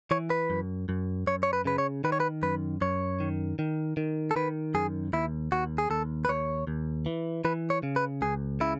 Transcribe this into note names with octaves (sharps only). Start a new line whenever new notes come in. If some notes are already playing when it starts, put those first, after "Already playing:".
E3 C#5
B4
F#2
F#2
F#2 C#5
C#5
B4
C#3 B4
C#5
D#3 B4
C#5
B4
F#2 B4
F#2 C#5
D#3
D#3
D#3
A4
D#3 B4
F#2 G#4
D#2 E4
D#2 F#4
G#4
D#2 A4
B4
D#2 C#5
D#2
E3
E3 B4
C#5
C#3
B4
C#2 G#4
C#3 E4